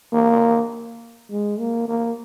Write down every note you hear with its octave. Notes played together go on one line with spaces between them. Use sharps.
A#3
G#3
A#3
A#3